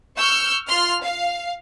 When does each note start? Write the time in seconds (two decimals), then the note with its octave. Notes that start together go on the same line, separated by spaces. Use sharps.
0.18 C#6 E6 F6 G6
0.68 F4 C6 F6
1.03 F5